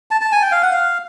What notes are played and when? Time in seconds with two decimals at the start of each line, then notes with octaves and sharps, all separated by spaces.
0.11 A5
0.21 A5
0.32 G#5
0.42 G5
0.52 F5
0.63 F#5
0.72 F5